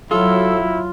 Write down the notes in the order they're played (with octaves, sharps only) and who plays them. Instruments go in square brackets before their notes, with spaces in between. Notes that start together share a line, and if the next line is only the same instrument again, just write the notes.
[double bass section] F#3 [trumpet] E4 [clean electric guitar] F4 [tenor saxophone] A4